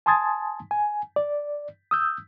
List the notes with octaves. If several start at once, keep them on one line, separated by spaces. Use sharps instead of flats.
G#5 A5 C6 D#6 G#6 A6
G#5
D5
D#6 E6 G6